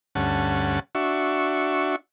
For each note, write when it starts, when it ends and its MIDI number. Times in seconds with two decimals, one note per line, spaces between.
0.15 0.80 38
0.15 0.80 43
0.15 0.80 61
0.15 0.80 78
0.15 0.80 81
0.95 1.96 62
0.95 1.96 66
0.95 1.96 76
0.95 1.96 85